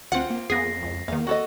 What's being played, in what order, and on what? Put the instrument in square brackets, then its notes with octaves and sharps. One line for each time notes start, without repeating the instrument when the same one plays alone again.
[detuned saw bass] D2 [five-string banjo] C4 F4 [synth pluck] F#5
[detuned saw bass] A#3
[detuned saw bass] F2 [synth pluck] A#3 B3 G#4 [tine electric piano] A#6 C7
[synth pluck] C#2
[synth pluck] E2 D#3 [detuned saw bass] A#3 [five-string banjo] F5
[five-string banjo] F#4 A4 D#5